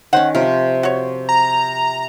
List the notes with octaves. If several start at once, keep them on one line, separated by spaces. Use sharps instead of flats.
D#3 C#4 C5 F#5
C3 F3 A#4
F#4 C#5
A#5